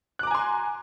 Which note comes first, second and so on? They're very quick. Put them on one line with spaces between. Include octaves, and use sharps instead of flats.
F#6 D6 A#5 G#5 C6